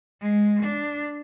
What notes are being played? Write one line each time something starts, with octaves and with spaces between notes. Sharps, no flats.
G#3
D4